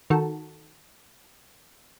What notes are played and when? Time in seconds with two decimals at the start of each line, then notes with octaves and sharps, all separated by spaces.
0.10 D#3 F#4 A4